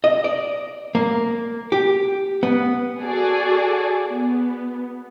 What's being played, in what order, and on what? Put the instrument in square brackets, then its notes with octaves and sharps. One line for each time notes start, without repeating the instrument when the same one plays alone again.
[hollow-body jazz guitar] D#5
D5
A#3
G4
B3
[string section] F#4 G#4 A4 D5
B3